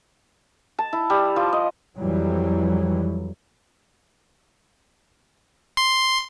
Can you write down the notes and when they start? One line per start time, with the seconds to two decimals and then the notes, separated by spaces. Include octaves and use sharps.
0.79 A5
0.93 E4
1.10 G3
1.36 F3
1.53 D#5
1.98 F2 E3 F#3 G3
5.77 C6